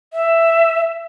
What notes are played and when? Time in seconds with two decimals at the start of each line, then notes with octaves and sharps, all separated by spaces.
0.13 E5